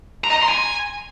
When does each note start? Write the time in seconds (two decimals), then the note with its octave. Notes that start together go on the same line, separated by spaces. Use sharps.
0.24 A#5
0.30 D#5
0.36 A#5
0.42 C6
0.49 G#5